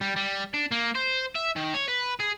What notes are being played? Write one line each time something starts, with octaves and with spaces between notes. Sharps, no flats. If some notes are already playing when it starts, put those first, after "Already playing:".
G3
G3
D4
A#3
C5
E5
D#3
C#5
B4
G#4